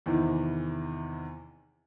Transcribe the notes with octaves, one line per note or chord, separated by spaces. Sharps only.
E2 C3 D#3 E3